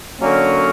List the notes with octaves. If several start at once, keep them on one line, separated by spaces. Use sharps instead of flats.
D3 F#3 A#3 C#4